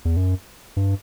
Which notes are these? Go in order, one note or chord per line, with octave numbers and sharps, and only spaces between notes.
E2
F#2
G2